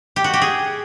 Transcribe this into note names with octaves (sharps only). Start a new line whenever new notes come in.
G4
F#4
G4
G#4